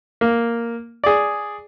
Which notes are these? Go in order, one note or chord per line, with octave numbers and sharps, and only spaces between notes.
A#3
G#4 D5